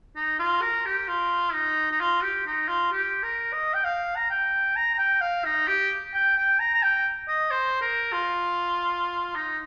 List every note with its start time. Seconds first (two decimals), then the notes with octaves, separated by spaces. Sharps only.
0.16 D#4
0.39 F4
0.62 A#4
0.86 G4
1.08 F4
1.53 D#4
1.91 D#4
2.01 F4
2.23 G4
2.46 D#4
2.68 F4
2.92 G4
3.23 A#4
3.53 D#5
3.74 G5
3.84 F5
4.16 A#5
4.30 G5
4.76 A#5
4.94 A#5
4.98 G5
5.21 F5
5.45 D#4
5.68 G4
6.14 G5
6.37 G5
6.59 A#5
6.74 A#5
6.83 G5
7.28 D#5
7.51 C5
7.81 A#4
8.12 F4
9.35 D#4